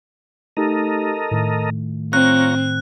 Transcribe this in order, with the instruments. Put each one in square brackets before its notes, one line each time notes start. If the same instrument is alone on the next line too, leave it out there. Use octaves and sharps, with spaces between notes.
[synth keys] A3 D#4 G4 [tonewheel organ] A4 A#4 D#5
[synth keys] A2 D#3 A3
[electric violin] C4 [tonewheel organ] F4 C#5 A#5 [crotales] F#6